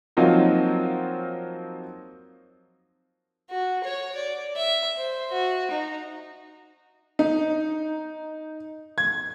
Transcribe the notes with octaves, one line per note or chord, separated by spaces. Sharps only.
F3 F#3 A#3 C4 D#4 F4
F#4
C#5
D5
E5
C5
F#4
D#4
D#4
G#6